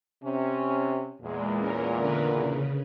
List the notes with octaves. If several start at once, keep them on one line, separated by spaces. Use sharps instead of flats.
C3 C#4
E2 A#2 G#3
C#4 A#4
D3 A#4 B4
C#3